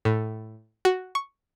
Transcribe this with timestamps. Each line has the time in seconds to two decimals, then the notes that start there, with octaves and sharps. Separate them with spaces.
0.05 A2
0.85 F#4
1.15 C#6